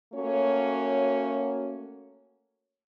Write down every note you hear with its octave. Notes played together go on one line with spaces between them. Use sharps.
A3 A#3 C#4 F#4 C#5